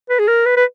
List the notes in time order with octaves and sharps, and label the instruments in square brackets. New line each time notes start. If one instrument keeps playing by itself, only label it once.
[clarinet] B4
G#4
A#4
B4
B4